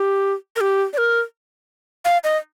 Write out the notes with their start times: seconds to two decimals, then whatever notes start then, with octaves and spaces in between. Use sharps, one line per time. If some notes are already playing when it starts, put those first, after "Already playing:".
Already playing: G4
0.56 A#4
0.61 G4
0.93 D5
0.98 A#4
2.05 F5
2.24 D#5